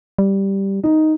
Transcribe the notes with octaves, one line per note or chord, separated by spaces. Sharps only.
G3
D#4